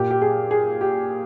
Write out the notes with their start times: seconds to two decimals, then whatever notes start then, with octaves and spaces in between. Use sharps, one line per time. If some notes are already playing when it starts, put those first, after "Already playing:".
Already playing: A#2 G4
0.11 G4
0.22 G#4
0.51 G#4
0.81 G4